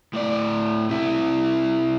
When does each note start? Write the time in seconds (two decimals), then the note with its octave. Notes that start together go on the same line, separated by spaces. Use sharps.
0.13 A2 D5
0.89 C3 E4